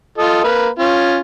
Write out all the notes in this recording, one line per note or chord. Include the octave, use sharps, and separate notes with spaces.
F4 A4 D#5
A#3 B4
C#4 F4